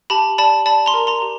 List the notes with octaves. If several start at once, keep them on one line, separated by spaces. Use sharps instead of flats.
G4 A5 B5
D5 A5 B5
D5 A5 B5
A#5 C6
A#4
A#5 C6
G4